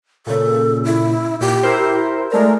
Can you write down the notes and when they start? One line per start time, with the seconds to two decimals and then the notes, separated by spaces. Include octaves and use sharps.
0.27 A#2 C#3 A4
0.85 E4
1.41 A#2 G4
1.63 E4 A#4 C5
2.32 G#3 A3 A#4 D5